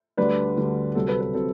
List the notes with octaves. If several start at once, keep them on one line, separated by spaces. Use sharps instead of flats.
D2 D3 G3 D4 B4 D5
D2 D3 G3 D4
C2 C3 F#3 C4 A4
B4
B4
C3 F#3 C4 A4